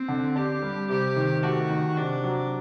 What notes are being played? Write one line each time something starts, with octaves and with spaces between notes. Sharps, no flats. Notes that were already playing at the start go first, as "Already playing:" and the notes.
Already playing: C4
D3
D4 G4
G3
C3 G4
D#3
A3 F#4
D#3
C3 D4
F#3